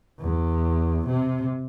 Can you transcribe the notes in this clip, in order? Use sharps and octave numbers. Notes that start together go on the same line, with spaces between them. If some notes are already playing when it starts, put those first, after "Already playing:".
E2
C3